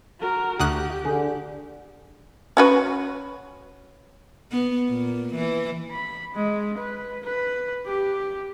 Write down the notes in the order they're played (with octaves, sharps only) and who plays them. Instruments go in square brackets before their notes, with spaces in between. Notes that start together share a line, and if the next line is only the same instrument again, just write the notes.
[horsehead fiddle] F#4 A#4
[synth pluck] D2 D#6 F#6 [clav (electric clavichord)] F#4 [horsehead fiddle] G4
[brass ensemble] D3 [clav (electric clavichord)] G#4
[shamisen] C#4 F#4 B4
[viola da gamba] B3
A#2
E3
[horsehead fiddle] B5
G#3
B4
B4
G4